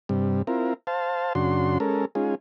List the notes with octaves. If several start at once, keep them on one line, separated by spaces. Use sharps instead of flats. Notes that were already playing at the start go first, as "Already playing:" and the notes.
G2 C3 G3
C4 E4 F4 A#4
C5 F5 A5
F#2 C#3 D4 F#4 C6
G#3 C#4 A4 A#4
G#3 C#4 D#4 F4 G#4